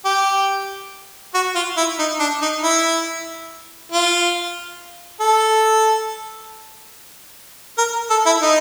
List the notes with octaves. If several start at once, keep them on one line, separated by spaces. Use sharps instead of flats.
G4
F#4
F4
E4
D#4
D4
D#4
E4
F4
A4
A#4
A4
E4
D#4